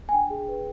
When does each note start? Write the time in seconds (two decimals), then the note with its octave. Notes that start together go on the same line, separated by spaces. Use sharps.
0.09 G#5
0.13 D4 G5
0.30 G#4
0.48 B4